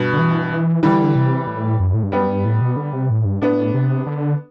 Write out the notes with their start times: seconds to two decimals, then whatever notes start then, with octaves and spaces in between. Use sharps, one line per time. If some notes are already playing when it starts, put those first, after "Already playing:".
Already playing: G2 B2
0.13 D3
0.19 E3
0.51 E3
0.83 D3 E3 G3
1.16 C3
1.48 A2
1.80 F#2
1.94 A2
2.03 G2
2.12 F#2 G3 B3
2.29 G2
2.45 A2
2.61 B2
2.77 D3
2.93 C3
3.10 A2
3.25 G2
3.42 A2 B3 D4
3.74 C3
4.07 D3